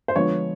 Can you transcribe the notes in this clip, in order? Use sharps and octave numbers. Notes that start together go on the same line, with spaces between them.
C5
D3 F3 G#3 B3 C#5